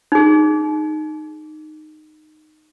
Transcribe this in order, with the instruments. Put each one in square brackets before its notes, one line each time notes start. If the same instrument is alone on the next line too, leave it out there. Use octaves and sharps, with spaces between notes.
[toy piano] D#4 G#4